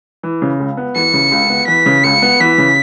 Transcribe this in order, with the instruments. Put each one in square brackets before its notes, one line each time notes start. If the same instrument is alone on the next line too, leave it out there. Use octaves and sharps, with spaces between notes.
[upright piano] E3
C#3
C#2
B3
[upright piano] E3 [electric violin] C#7
[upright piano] C#3
C#2
B3
[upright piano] E3 [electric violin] B6
[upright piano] C#3
[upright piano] C#2 [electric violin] C#7
[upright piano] B3
[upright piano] E3 [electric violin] B6
[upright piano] C#3